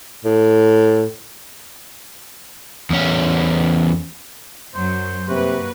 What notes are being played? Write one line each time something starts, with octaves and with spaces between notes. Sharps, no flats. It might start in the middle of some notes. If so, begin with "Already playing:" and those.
A2
E2 C#4
F#2 F#3 C5
G2 C3 A#3 F#4 B4